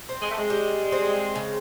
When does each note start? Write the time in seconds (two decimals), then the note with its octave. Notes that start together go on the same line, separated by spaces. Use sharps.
0.09 C4
0.22 G#3
0.30 A3
0.38 G#3
0.50 G3
0.92 C4
1.35 C#3